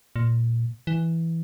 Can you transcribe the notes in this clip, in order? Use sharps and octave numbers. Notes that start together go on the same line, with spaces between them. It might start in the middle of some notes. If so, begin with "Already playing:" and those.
A#2
E3